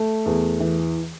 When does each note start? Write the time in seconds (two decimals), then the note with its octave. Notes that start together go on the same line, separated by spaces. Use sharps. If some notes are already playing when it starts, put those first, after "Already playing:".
Already playing: A3
0.26 E2
0.60 E3